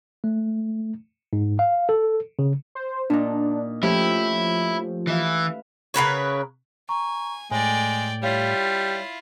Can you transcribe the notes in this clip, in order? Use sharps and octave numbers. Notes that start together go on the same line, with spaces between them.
A3
G#2
F5
A4
C#3
C5
A#2 D4 D#4
F3 A3 C#4 E4 G4
E3 B4 E5 F5
C#3 A#4 B4 C#5
G#5 A#5 C#6
A2 G#3 D5 G5 G#5
G3 E4 F4 C#5 F5